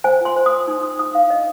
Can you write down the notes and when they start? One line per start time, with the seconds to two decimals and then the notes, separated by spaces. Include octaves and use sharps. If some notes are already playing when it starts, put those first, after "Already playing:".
0.04 C5 G#5
0.21 F4 C6
0.36 C5
0.46 D#6
0.51 C5
0.68 D#4
0.83 D#4 D#6
0.99 D#4 D#6
1.15 D#4 F5
1.30 D4 D#5